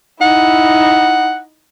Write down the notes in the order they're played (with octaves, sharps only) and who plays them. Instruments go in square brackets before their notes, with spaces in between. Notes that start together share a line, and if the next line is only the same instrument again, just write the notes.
[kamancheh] D#4 E4 [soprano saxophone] F#5